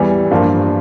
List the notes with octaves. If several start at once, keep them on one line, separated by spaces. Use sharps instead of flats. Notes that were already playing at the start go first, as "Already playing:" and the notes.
Already playing: E2 E3 G3
G2 F3 A#3 F4